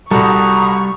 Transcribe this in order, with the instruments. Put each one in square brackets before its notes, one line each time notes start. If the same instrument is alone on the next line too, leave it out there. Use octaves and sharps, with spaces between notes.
[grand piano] C2 F#4 A4 [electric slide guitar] G3 [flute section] A#5 D#6 [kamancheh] C#6